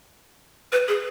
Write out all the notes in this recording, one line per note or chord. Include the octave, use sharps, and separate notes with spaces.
B4
G#4